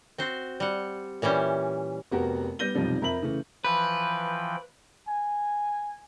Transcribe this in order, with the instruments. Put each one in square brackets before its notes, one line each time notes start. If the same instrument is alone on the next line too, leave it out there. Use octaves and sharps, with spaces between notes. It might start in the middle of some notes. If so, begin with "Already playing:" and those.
[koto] C4 F#4 C5
G3 F#5
A#2 E3 G3 C#4 G4
[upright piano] F1 B3 F#4 G4 A#4
G3 B3 G6 A#6 D#7 G7
B1 F2 C3 D#3 F3 G3
F2 A#4 E5 B5 F#7
C#3 E3 A3
[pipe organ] E3 F3 G5 [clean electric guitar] B4
[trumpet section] G#5